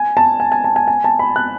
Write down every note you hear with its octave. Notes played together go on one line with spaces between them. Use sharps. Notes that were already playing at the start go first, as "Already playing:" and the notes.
Already playing: G#5
A5
G#5
G#5
A5
G#5
G#5
A5
B5
F#6